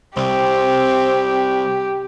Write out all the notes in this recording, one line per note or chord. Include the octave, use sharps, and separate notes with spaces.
C2 C4 G4